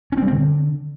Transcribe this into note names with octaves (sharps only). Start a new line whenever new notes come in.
C#4
C4
G3
C4
D3